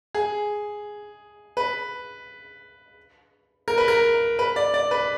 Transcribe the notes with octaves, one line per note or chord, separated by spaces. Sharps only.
G#4
B4
A#4
B4
A#4
B4
D5
D5
B4